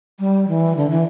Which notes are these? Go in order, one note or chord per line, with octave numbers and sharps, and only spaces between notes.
G3
E3
D3
E3